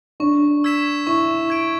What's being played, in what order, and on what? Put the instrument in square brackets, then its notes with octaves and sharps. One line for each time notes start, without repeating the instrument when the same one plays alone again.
[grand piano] D4 [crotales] C#6
[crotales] E6 G#6 B6 E7
[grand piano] E4 [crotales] C#6
[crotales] G#6 D7